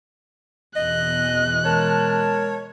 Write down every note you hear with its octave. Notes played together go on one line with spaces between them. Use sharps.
E2 B2 E3 D#5 F#6
G#3 A#4 C#5 A5